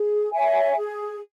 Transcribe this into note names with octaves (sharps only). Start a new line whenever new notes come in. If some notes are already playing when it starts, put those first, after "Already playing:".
Already playing: G#4
C#5 E5 G#5
G#4